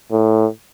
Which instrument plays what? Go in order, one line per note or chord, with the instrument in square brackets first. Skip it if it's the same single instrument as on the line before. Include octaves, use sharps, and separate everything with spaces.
[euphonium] A2